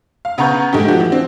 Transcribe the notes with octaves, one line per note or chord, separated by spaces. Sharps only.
F5
C#3 B3 B4 A#5 C#6 G6
G#2 A3 G4
F3 F#4 G4
E3
C4